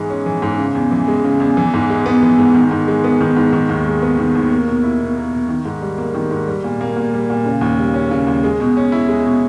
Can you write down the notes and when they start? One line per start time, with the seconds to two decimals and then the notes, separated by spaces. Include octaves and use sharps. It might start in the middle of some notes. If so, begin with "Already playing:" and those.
Already playing: G#2 E3 G#3
0.10 C#4
0.26 E3
0.42 G#2
0.58 C#3
0.75 E2
0.91 E3
1.08 G#3
1.24 C#3
1.40 E2
1.57 E3
1.74 G#2
1.90 G#3
2.06 B3
2.23 E3
2.39 G#2
2.55 D#3
2.71 G#2
2.88 G#3
3.04 B3
3.21 D#3
3.37 G#2
3.53 D#3
3.69 D#2
3.86 G#3
4.02 B3
4.19 D#3
4.35 D#2
4.51 A#3
4.67 B2
4.84 E4
5.00 B2
5.17 A#3
5.33 B2
5.49 D#3
5.65 G#2
5.82 G3
5.98 A#3
6.15 D#3
6.31 G#2
6.48 G3
6.64 A#2
6.81 A#3
6.96 A#2
7.13 G3
7.30 A#2
7.46 C#3
7.61 D#2
7.78 G3
7.94 C#4
8.11 C#3
8.27 D#2
8.44 G#3
8.60 B2
8.77 C#4
8.92 E4
9.09 G#3
9.26 B2